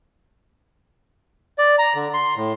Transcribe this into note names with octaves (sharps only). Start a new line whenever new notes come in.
D5
A#5
D3
C6
A2